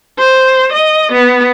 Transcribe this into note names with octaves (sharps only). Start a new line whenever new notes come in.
C5
D#5
B3